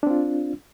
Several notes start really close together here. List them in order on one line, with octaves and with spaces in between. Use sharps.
D4 C4 F4